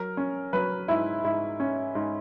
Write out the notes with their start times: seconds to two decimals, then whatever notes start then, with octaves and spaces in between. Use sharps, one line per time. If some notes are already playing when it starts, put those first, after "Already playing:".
Already playing: F#3 A#4
0.17 C#4
0.53 F#3 B4
0.88 G#2 E4
1.24 G#2 E4
1.60 C#4
1.95 G#2